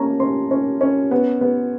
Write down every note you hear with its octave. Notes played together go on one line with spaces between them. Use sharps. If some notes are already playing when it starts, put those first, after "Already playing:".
Already playing: A#3 C#4 A5 A#5
C#4 C6
C#4
C#4
B3
B3